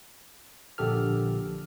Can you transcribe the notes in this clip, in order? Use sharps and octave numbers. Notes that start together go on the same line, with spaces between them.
A#1 D3 G4 A4 F6